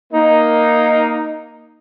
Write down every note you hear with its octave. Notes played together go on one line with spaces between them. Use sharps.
A#3 D#4